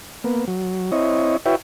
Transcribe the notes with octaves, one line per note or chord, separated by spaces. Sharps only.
A#3 B3
F#3
C4 E4 C#5 D#5
E4 F#4 B4 C#5 E5 G5